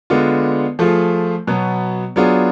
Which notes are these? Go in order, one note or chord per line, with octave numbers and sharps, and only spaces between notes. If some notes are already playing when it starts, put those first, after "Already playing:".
D3 G#3 B3 D4 F4
F3 A3 F4 G#4
B2 F#3 B3
F#3 B3 D4 F4 G#4